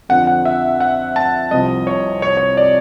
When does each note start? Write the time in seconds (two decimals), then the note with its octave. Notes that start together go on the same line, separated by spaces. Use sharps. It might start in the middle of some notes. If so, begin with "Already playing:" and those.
0.09 F2 D3 F3 F#5
0.27 F#5
0.45 E5
0.80 F#5
1.16 A5
1.51 C2 C3 F3 D#5
1.87 C#5
2.22 C#5
2.37 C#5
2.57 D5